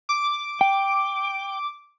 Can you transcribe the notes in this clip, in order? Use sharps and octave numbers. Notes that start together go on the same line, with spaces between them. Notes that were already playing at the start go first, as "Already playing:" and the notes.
D6
G5